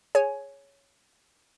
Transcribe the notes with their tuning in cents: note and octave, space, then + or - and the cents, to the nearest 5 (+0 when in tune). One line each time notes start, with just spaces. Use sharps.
G#4 +0 C#5 +0 G#5 +15